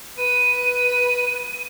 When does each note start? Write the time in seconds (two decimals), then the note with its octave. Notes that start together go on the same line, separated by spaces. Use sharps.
0.17 B4 D#7